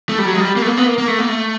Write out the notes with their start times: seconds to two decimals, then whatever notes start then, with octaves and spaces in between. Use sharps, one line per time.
0.09 A3
0.19 G3
0.25 F#3
0.34 G#3
0.40 G3
0.56 A#3
0.62 A3
0.67 A#3
0.77 B3
0.87 A#3
0.98 A#3
1.08 A3
1.19 A#3
1.29 A3